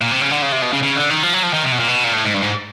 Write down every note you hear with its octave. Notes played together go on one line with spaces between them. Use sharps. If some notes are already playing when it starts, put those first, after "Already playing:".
A#2
C3
C#3
D3
C#3
C3
B2
C#3
C#3
D3
D#3
F3
F#3
F3
D#3
C3
B2
A#2
B2
A#2
A2
G#2
G2
G#2